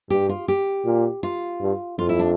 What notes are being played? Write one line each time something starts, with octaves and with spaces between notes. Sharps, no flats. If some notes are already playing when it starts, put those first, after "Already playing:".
G2 G4
F4
G4
A#2
F4
G2
F2 F4
E4
D4